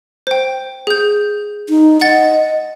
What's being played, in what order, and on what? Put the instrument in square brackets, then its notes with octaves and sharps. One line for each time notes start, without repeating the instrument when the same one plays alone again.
[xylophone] C5 G5
G#4 G6
[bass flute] D#4
[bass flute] D#5 [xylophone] F#5 A6